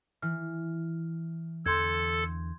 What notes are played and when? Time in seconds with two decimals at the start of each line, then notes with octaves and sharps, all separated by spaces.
0.22 E3 F6
1.66 E2 D3 A4 C6 G6 G#6